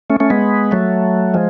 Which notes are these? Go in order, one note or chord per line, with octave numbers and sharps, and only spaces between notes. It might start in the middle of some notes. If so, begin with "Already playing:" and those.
A3 C#4
A3 C#4
G#3 B3
F#3 A3
F3 G#3